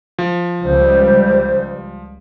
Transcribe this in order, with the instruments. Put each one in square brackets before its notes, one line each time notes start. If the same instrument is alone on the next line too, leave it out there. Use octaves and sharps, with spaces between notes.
[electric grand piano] F3
[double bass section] C#2 G3 [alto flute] C5